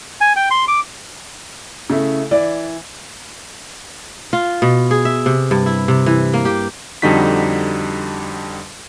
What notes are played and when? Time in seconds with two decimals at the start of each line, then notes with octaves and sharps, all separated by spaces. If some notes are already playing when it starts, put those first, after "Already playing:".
0.21 G#5
0.36 G5
0.51 C6
0.68 D6
1.90 C#3 A3 E4
2.31 E3 D5
4.33 F4
4.62 B2
4.91 G#4
5.05 E5
5.26 C3
5.51 G2
5.66 E4
5.88 C3
6.06 E3
6.33 A#3
6.45 G4
7.02 F2 D3 G3 D#4 F#4 B6